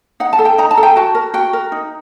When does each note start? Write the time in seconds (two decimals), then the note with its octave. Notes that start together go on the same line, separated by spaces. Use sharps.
0.20 D#4 F#5
0.33 A5
0.39 A4
0.45 G5
0.58 D#4 A#5
0.71 A5
0.77 A4
0.83 G5
0.96 F#4 A5
1.15 A#4
1.34 F#4 G5
1.53 A#4
1.72 D#4